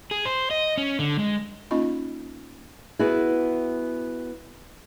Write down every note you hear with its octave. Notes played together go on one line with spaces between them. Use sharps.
G#4
C5
D#5
C#4
D3
G#3
A#3 C#4 D#4 F4 D#5 B5
B3 E4 F#4 G#4